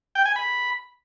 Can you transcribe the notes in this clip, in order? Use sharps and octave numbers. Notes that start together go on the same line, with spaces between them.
G5
G#5
B5